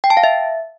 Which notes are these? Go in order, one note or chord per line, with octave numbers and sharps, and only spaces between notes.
G5
A5
F5
E5